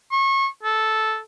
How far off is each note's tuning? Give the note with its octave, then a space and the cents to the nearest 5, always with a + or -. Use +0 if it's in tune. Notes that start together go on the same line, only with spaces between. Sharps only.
C#6 -30
A4 -10